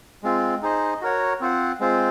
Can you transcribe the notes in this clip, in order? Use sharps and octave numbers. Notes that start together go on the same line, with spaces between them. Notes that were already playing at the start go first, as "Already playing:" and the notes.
G#3 C4 F4
D#4 G#4 C5 D#5
F#4 A#4 C#5 F#5
C4 F4 C5 F#5
G#3 C4 F4 C5